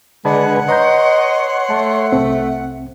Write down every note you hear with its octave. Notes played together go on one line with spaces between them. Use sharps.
D3 G#3 B4 D5 F#5 G#5 A5 B5
B4 C#5 D#5 A#5 C6 G6
A3 A5
C2 C4